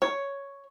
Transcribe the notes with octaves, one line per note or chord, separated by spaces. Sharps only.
C#5